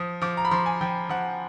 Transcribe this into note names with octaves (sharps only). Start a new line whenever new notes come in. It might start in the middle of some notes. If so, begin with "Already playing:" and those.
Already playing: F3 D#6
F3 D6
A#5
B5
F3 C6
G#5
F3 G5
F3 F#5